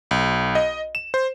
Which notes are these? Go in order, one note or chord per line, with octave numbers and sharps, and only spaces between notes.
B1
D#5
E7
C5